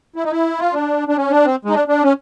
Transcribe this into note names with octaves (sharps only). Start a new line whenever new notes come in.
E4
D#4
E4
F4
D4
D4
C#4
D4
C4
G#3 D#4
D4
D4
C#4